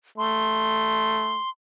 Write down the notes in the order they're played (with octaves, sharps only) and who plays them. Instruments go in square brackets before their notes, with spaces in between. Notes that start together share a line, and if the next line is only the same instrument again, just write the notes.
[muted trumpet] A3 [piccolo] C6